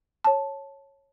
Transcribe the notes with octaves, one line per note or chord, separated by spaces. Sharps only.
C#5 A5